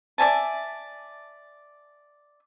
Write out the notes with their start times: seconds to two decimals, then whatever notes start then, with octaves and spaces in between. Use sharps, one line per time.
0.18 D5 E5 G#5 A5